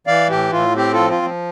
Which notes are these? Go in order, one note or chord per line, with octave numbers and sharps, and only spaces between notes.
E3 D5 F5
A2 G4
A2 F4
C4 G4
F4 A4
F3
F4
F3